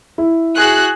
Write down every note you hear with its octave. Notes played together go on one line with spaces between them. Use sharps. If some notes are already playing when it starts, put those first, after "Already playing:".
E4
F#4 G#4 F#6